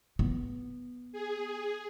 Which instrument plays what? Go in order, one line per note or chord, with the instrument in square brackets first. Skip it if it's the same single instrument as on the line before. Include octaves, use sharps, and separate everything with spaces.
[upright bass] B3
[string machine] G#4